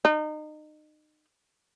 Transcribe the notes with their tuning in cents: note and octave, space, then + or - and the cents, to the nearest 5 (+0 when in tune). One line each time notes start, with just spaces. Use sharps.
D#4 -30